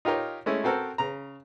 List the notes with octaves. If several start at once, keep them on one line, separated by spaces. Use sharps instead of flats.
D#4 F4 G4 A#4 C#5
G#3 A3 C#4 E4
C4 F#4 A4 A#4 C5
C#3 A#5